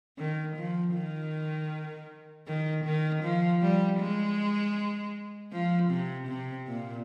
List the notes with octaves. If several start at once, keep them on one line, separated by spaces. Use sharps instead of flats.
D#3
F3
D#3
D#3
D#3
F3
G3
G#3
F3
C3
C3
A#2